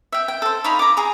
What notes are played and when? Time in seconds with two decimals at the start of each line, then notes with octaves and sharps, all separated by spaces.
0.12 E5 G5
0.28 G5
0.42 A4 C5
0.64 D#4 C#5 F5 B5
0.79 A#5 D6
0.97 G#4 A#5